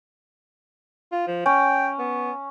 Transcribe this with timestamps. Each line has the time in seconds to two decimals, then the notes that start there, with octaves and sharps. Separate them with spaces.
1.12 F4
1.27 F3
1.46 C#4 G5
1.99 B3